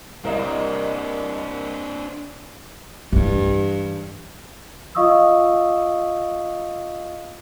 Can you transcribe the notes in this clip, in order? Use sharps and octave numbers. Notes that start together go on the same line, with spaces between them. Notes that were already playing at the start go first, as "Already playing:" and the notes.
C2 C4 D4 A#4 D#5
G2 E3 D4
F4 D#5 F5 C#6 D#6 E6